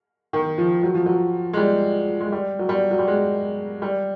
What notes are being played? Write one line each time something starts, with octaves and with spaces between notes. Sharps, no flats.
D#3
F3
F#3
F3
F#3
G#3
G3
G#3
G3
F#3
G3
F#3
G3
G#3
G3